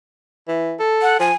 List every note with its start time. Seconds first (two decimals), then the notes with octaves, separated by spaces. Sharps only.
0.48 E3
0.80 A4
1.02 F#5
1.20 F3 G#5